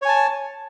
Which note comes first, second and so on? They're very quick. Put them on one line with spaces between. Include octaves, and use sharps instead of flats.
C#5 G#5 A5